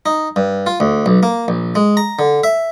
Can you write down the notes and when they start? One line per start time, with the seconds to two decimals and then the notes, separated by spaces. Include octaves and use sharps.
0.06 D#4
0.36 G2
0.66 F4
0.80 D2
1.06 B1
1.23 A#3
1.48 A#1
1.75 G#3
1.97 A#5
2.19 D3
2.44 E5